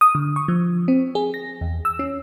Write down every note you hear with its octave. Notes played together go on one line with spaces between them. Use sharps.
D#6
D3
C#6
F3
C4
G#4
A#6
E2
E6
C#4